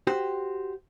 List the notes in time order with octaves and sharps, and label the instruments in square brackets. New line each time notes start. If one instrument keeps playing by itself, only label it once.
[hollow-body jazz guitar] F#4 G4 C5